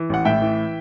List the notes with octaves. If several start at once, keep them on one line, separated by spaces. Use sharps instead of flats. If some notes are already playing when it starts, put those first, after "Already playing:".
Already playing: E3
A1 F#5
A2 E5 G5
E3